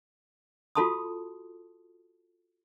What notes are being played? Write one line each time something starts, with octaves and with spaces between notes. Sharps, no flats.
F4 F#4 A4 A5 C6 D#6